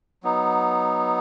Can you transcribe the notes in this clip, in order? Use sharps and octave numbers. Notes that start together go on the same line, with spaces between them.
F#3 B3 D#4